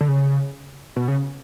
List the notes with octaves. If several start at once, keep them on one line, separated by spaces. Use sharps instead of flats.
D3
C#3
B2
C#3